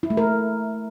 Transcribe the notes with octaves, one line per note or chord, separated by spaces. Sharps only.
E4
A3
A#4